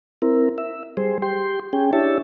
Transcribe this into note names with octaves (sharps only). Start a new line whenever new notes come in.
C4 E4 A#4
E5
G3 G#4 C5
G4 G5 C6
C#4 G#4 G5
D4 E4 G4 C#5 E5 A5